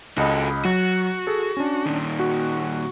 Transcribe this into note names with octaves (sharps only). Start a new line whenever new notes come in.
C#2 F#4 A4 D#5 B5
F#3 F#4
G#4 A4
C#4 D4
A#2 D#3
F#4